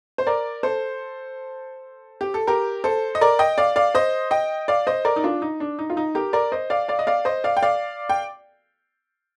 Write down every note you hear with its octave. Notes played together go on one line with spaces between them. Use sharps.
C5
A#4 D5
A4 C5
G4
A4
G4 A#4
A4 C5
D#5
A#4 D5
D#5 G5
D5 F5
D5 F5
C5 D#5
D#5 G5
D5 F5
C5 D#5
A#4 D5
D#4
D4 F4
D#4
D4
D#4
F4
D#4
G4 A#4
A#4 D5
C5 D#5
D5 F5
D5 F5
D#5
D5 F5
C5 D#5
D5 F5
G5
D5 F5
G5